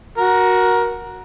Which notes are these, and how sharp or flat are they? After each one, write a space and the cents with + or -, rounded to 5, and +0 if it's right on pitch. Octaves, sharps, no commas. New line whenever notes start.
F#4 +0 A#4 +15